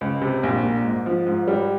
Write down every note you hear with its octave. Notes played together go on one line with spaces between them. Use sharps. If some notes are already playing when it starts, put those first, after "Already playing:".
C#2
C3
A#1
A#2
G#2
F3
G#2
G3